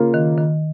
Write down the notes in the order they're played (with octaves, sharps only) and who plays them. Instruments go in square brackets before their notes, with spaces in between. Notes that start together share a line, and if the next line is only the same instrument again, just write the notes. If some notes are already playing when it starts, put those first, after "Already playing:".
Already playing: [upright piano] C#3 A#3 F4
[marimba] D#3
D#3